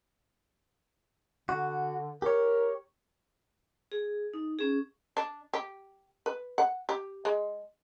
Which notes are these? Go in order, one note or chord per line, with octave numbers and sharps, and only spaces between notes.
D3 F#4
G4 A#4 C#5
G#4
D#4
C#4 G#4
D4
G4
B4
F#5
G4
G#3